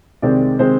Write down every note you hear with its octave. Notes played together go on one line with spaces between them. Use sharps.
C2 C3 D#3 G#3 C4 D5
C3 D#3 G#3 C4 C5